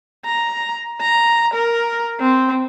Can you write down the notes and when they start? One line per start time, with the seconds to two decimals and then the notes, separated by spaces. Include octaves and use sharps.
0.25 A#5
1.01 A#5
1.54 A#4
2.20 C4